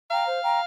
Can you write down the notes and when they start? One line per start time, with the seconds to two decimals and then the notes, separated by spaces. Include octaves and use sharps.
0.10 F5 G5 A#5
0.26 C5
0.43 G5 A#5